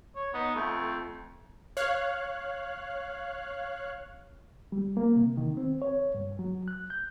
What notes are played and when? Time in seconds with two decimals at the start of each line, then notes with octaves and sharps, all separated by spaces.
0.15 C#5
0.34 B3 D#4
0.56 F2 A3
1.77 C#5 F5 F#6
4.72 G3
4.97 A#3
5.16 C3
5.37 D#3
5.57 C4
5.82 C#5
6.15 G2
6.39 F#3
6.68 F#6
6.90 G6